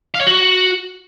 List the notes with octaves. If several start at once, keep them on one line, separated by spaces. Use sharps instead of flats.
F5
C#5
F#4